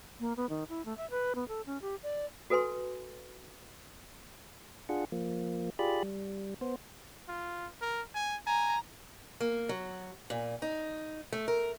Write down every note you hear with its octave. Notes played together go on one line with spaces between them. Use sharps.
A#3
B3
D#3
E4
A3
E5
B4
B3
A4
C#4
G4
D5
F#4 A4 B4 G#5 C6
D4 F4 G#4 F#5
F3 A#3
F4 G4 G#4 D5 B5
G3
B3 C5
F4
A#4
G#5
G#5 A#5
A#3
F#3
A#2
D#4
A3
A#4